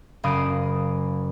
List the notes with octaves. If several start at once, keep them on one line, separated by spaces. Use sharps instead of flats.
F#1 F5 B5 D#6 D7 E7